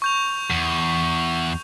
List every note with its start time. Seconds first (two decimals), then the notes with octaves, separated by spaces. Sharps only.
0.02 C#6 G6 F7
0.50 E2